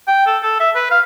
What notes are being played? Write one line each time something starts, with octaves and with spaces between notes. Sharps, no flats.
G5
A4
A4
E5
B4
F5